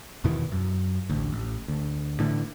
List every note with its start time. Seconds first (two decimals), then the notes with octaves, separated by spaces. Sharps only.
0.24 E2 B2 D#3 E3
0.52 F#2
1.10 A1 D2
1.33 A1
1.68 D2
2.20 A2 D3 E3